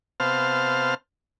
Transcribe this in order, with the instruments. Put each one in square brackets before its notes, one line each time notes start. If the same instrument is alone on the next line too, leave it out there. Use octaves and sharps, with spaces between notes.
[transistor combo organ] C3 B3 C5 F5 A5 F6